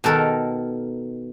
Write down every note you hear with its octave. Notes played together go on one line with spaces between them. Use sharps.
B2 D#3 A4 A#4